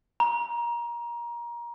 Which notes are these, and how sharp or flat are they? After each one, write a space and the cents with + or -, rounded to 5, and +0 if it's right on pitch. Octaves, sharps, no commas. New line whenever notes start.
A#5 +25